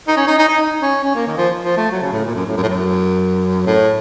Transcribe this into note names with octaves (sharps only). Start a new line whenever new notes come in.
D#4
C#4
D#4
D#4
D#4
C#4
C#4
A#3
D#3
F3
F3
A3
F#3
C#3
A2
A#2
F#2
A2
F#2
A2
F#2
A2